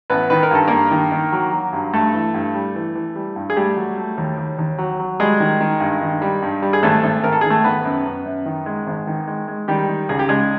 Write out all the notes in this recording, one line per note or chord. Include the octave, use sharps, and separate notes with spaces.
A1 B3 B4
D#3 B4
A#4
G2 A4
G2 A#3 A#4
D#3
D#3
F#3
F#3
G2
G2 A3 A4
E3
G2
G3
E3
E3
G3
G2
G#4
G3 A3 G4
F#3
A3
D#2
D#2
D#2
F#3
F#3
G3 G#3 G#4
D#3
D#3
G2
D#3
G3
G2
G3
G#4
G#1 A3 A4
G#1
G#1 A#4
A4
D#3 G#4
A3 A4
G#1 B3 B4
F#2
F#2
F#2
D#3
G#3
G#1
D#3
G#3
G#3
D#3 G3 G4
D#3
C#2 G#4
G4
C#2 G#3 G#4